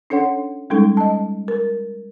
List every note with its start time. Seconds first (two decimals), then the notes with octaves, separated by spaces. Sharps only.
0.10 C#4 D4 A4 C#5 F#5
0.70 G3 G#3 C#4 D#4 A4
0.97 D#5 A5
1.48 A#4